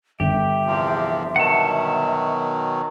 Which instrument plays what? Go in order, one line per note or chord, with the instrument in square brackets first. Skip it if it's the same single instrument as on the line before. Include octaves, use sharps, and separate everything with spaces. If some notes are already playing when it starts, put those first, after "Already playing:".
[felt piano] G1 [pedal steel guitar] G4 [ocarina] E5
[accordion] E2 C3 F3
[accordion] B2 D#3 F#3 [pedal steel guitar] F#5 A5